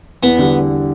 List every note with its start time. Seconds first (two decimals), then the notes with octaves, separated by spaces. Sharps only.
0.23 E2 B3
0.39 D3 G3